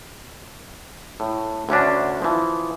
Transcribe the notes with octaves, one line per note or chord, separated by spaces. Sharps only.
A2
D2 D3 C#4 D4
E3 F3